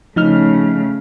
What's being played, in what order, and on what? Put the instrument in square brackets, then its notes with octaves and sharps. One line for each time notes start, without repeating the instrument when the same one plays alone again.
[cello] C#3 A3 [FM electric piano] F3 D#4 F6